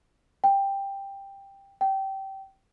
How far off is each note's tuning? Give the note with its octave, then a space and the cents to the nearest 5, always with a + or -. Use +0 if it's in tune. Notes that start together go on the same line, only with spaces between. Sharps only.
G5 +10
G5 -20